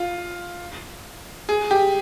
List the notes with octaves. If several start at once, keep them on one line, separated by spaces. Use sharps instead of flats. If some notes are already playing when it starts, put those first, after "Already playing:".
Already playing: F4
G#4
G4